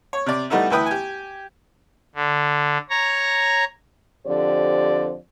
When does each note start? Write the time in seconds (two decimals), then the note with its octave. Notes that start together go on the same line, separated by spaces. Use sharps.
0.13 C#5
0.26 C3 D5
0.50 G3 A3 B3 D#4 E4
0.70 D2 E3 E4 B4 G5 D#6
0.86 G4 G#5
2.15 D3
2.90 C#5 A#5
4.27 F2 D3 G4 C5 D5